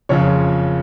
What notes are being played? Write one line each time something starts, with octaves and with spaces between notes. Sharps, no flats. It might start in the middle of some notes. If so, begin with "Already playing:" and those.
F#1 F2 C#3 C#5